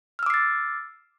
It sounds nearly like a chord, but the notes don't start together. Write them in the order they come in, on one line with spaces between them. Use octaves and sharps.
F6 E6 D6 C7 A6